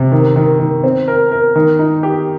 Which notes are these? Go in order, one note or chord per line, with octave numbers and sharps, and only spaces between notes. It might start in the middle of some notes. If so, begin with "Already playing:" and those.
Already playing: C3
D#3
D#3
D#3
C4
A#4
A#4
D#3
D#4
G4